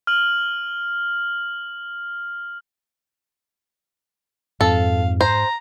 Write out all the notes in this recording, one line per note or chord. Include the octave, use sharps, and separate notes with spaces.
F6 F#7
F2 G#2 A4 F5
C5 A#5